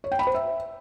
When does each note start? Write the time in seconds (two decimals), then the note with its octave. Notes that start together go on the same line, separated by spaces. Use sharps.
0.04 C#5
0.12 G5
0.19 B5
0.27 C5
0.34 E5